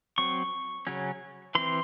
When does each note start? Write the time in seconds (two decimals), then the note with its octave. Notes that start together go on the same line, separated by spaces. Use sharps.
0.18 F#3 C4 C#6
0.87 C#3 F#3 C#4
1.55 E3 C4 C6